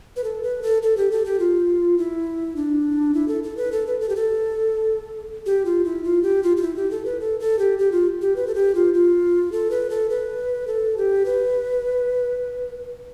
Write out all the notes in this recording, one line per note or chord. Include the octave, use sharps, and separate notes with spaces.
B4
A4
B4
A4
A4
G4
A4
G4
F4
E4
D4
E4
A4
A4
B4
A4
B4
A4
G4
A4
G4
F4
E4
F4
G4
F4
F4
E4
G4
A4
B4
A4
A4
G4
G4
F4
G4
B4
A4
G4
F4
F4
A4
B4
A4
B4
A4
G4
B4